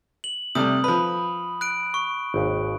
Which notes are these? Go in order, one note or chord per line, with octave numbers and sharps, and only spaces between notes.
F#7
C3 G3 A3 D#6
F3 B4 B5
F#6 D7
C#6
G#1 D#2